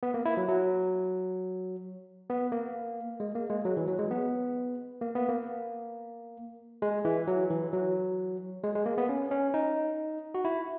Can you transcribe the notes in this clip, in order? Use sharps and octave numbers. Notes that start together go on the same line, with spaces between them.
B3
A#3
E4
F#3
F#3
B3
A#3
G#3
A#3
G#3
F#3
E3
F#3
G#3
B3
A#3
B3
A#3
G#3
E3
F#3
E3
F#3
G#3
G#3
A#3
B3
C#4
C#4
D#4
F#4
E4